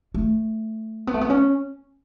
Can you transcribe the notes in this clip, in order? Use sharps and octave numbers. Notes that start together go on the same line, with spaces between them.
A3
B3
A3
B3
C#4